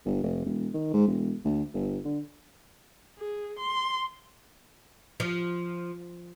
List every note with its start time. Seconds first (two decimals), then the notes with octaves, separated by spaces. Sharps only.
0.06 G1
0.23 F1
0.46 E1
0.74 D#3
0.94 G#2
1.08 E1
1.45 D2
1.74 G1
2.05 D3
3.18 G#4
3.59 C6
5.20 F3